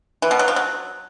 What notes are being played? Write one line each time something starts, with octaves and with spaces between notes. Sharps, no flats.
E3
B2
F#3
F3
F#3